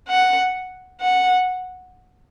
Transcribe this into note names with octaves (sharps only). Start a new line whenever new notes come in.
F#5
F#5